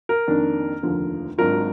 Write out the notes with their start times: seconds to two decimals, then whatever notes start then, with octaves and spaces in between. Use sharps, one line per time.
0.09 A#4
0.28 F2 D#3 A#3 D4
0.82 F1 D#2 D3 F3
1.38 G#1 G#2 F#3 D4 F4 A#4